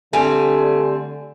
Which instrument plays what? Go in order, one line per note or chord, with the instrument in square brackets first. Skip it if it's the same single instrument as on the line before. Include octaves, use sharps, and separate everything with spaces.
[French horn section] D3 [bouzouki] G3 C4 [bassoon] A3 [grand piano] G#5